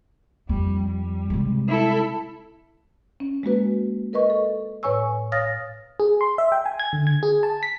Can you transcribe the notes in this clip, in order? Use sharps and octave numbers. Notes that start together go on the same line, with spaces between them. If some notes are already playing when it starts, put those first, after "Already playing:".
F2 G3
G3
C3 G#3
E4 A4
C#4
G#3 A#3 F#4 B4
A#4 B4 D#5 C#6
A4
A2 B4 C#5 G#5 C#6 E6
C#5 F5 D#6 F6 A6 A#6
G#4
C6
E5
G5
G#5
G#6
D3
G#6
G#4
A5
B6